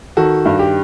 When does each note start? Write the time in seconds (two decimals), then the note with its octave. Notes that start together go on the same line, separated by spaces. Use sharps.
0.17 D#3 F#4 A4
0.46 G2
0.59 G4